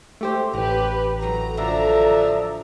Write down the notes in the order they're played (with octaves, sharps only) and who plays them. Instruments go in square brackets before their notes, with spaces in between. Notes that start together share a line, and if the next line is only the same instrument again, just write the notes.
[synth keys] A3 G4 C5
[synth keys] A1 [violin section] G4 B4 [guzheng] A#5
[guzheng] A2 F#3 B4 [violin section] A#5
[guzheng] A2 D3 [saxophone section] F3 D4 E5